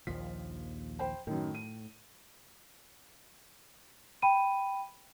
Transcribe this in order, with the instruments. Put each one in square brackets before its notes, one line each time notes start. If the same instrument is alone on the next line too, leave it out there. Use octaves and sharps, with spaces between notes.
[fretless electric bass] A#1 D#2 F3 [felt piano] B6
[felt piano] C5 G5 B5
[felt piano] F#2 D#3 [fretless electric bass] A2
[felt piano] D#7
[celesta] G5 B5 D#7